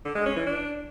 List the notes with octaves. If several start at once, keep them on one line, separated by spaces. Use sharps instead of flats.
D3
G#3
C#4
E3
D4